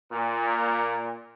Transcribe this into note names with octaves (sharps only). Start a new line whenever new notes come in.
A#2